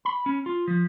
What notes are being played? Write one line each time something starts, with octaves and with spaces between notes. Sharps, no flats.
B5
C#4
F4
F3